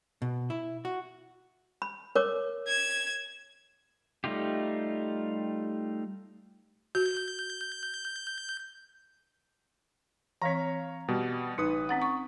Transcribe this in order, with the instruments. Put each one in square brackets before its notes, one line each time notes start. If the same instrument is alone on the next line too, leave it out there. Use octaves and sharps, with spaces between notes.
[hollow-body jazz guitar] B2
E4
F#4
[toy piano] B5
A#4 C#5 D6
[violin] G#6 E7
[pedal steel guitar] G3 A3 D#4 F4 G4
[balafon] F#4 [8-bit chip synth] G6
[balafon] E3 C4 [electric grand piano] C#5 F5 A#5
[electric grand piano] B2 G3 B3
[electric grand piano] A1 B4 D#6 [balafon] D#4
[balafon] C4 C#4 F#5
C#6